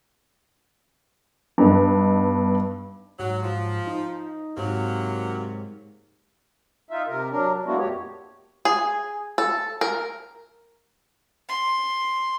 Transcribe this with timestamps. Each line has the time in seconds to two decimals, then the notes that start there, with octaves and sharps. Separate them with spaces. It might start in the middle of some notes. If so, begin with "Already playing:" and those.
1.58 G2 B3 D#4
3.19 G#2 F#3
3.43 G#2 F3
3.87 D#4
4.57 G#2 C3 F#3 A#3
6.91 D#4 F4 E5
7.08 C3 A#4
7.31 F#3 D4 A#4
7.66 G#3 A#3 B3 D4 E4 F#4
7.79 F2 A#2 G4 C#5
8.65 G#4
9.38 A4
9.81 A#4
11.49 C6